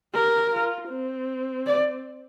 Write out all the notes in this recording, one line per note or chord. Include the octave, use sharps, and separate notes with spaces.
G4 A#4
F4
C4
D5